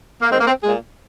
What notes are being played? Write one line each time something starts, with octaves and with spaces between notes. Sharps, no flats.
A#3
D#3 G#3 C4
A#3
C4
A#2 G#3 G#4